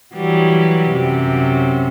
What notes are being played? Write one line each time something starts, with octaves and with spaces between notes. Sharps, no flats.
E3 F#3 G3
F#2 C3